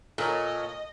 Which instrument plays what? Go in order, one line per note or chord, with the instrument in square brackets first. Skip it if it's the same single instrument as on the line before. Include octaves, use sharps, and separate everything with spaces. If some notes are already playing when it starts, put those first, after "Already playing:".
[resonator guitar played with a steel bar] A#2 [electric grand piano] A4 A#4 C#5 [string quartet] D#5